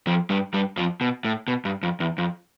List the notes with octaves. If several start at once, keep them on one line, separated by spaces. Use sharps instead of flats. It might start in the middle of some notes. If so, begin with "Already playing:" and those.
F2 F3
G2 G3
G2 G3
F2 F3
B2
A2
B2
G2
F2
E2
F2